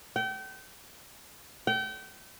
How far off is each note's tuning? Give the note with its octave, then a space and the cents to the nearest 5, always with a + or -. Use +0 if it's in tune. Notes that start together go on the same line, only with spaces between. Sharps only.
G5 -35
G5 -35